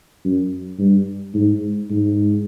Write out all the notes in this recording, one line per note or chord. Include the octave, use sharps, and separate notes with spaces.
F#2
G2
G#2
G#2